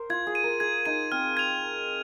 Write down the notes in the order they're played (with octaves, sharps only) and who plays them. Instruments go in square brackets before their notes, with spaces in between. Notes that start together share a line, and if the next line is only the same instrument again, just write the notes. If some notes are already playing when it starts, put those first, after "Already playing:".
Already playing: [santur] A#4 C5
[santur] F4 [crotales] G#6
[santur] G#4
[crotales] D#7
[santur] A#4
[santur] G#4 [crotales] G#6
[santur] D#4 [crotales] D#7
[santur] C4 [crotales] F6
[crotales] G#6 F7